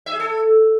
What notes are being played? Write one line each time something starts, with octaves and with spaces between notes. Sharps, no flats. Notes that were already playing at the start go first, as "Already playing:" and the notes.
E5
G#4
A4